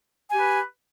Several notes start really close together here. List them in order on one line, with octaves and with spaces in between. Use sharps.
G#5 G4 B4